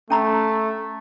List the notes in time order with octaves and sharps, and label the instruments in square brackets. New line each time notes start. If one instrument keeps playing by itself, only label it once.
[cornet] A3 [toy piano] C#4 A#5 B5